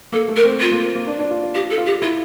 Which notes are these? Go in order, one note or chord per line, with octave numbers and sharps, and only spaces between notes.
A#3 A4
A3
A#4
C4
F4
A#3
A#3
D4
D4
F4
F4
F4 G4
A4
F4
G4
E4 F4